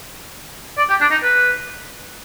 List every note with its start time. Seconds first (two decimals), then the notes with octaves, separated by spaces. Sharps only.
0.77 D5
0.89 G4
1.01 D4
1.11 D#4
1.23 B4